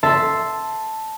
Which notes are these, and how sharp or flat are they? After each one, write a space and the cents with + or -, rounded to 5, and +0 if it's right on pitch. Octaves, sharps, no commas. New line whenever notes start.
E5 +0 A5 +0 C6 +0